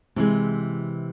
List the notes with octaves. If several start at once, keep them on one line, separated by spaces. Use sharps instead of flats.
C3 E3 G#3